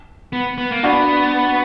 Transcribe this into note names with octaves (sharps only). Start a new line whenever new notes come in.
B3
B3
A#3
B3 D4 F#4